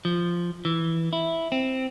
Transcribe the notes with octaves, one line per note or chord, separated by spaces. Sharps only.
F3
E3
E4
C4